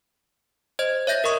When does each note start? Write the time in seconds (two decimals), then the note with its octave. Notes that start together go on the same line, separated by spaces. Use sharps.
0.79 C5 D#5 G#6
1.07 C#5 E5 G6 A#6
1.24 A#4 D#5 C#6 D#6